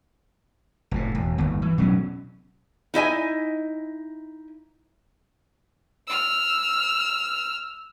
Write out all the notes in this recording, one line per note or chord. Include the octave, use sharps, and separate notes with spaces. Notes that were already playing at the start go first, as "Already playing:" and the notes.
F1 A2
E1
G1 D#2
E3
B2 F#3 A3 C#4
D#4 E4 D#5 G#5
E6 F6